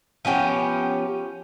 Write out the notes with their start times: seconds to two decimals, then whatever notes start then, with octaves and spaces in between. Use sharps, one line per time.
0.25 F3 B3 C#4 G4